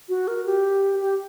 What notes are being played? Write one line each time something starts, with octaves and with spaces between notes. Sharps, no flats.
F#4
A#4
G4
G4